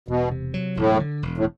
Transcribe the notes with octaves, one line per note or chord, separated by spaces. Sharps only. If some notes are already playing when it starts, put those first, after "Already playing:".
E1 B2
C3
F#3
E1 A2
D3
E1
A2